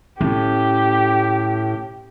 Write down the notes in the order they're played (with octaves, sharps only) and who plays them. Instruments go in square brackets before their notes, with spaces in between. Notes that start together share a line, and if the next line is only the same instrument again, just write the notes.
[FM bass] A2 [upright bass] C#4 [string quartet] G4